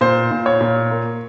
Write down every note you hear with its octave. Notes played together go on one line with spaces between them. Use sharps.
A#2 C5
A#2
C#5
A#2
A#3